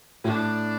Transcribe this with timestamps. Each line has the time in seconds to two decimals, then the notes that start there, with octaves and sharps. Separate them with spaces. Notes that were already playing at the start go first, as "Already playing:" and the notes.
0.24 A2 D4